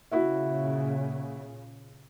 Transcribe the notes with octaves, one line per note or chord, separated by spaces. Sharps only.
A#2 C#3 E4 F#4 E5